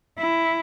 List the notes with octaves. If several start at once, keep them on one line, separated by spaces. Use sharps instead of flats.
E4